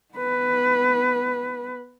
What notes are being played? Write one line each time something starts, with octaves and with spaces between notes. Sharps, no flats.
B3 B4